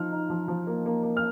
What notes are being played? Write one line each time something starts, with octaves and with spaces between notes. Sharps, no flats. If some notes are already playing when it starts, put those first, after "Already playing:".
Already playing: F3 D#4 F6
D#4
F3
F3
A#3
A#3
A#3
F6